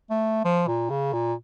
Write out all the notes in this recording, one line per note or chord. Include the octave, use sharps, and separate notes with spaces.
A3
F3
A#2
C#3
A#2